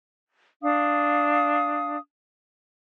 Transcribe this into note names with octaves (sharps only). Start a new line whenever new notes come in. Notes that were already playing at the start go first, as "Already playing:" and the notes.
D4 F5 D#6